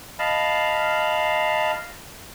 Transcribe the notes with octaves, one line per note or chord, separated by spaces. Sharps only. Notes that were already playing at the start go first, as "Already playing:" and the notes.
D#5 F5 A5 B5